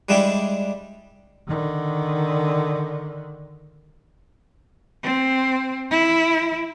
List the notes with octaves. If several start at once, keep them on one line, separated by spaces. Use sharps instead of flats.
G3 G#3 D4 E4 G4
D3 D#3
C4
E4